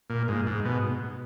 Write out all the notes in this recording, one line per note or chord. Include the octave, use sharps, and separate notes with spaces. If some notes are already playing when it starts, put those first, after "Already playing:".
A#2
G#2
G#2
B2